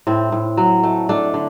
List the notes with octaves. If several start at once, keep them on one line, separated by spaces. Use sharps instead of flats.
A2 C4
A2
F#3
A3
A3 D4
D3